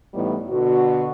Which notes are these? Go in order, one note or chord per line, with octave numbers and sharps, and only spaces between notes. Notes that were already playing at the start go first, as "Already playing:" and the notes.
A2 E3 G3 B3 D#4
B2 D3 F#4